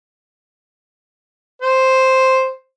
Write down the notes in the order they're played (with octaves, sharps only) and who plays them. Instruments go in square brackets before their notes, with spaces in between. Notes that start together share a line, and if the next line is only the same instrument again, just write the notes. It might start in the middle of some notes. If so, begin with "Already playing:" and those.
[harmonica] C5